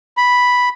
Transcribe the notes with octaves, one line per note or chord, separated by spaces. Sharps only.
B5